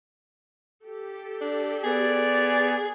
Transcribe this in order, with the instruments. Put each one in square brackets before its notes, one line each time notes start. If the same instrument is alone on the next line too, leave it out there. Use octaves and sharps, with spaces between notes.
[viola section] G4 A4
[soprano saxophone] D4
[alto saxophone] B3 [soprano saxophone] G#4 [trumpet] D5